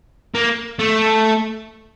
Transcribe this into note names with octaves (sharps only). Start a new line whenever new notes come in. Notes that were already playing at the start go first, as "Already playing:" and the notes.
A#3
A3